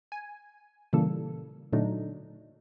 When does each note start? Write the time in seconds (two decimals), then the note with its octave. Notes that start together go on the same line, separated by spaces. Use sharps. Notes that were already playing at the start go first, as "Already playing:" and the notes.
0.12 G#5
0.93 A#2 C#3 E3 G3 A#3 A4
1.73 A#2 D3 F#3 A3 D4 D#4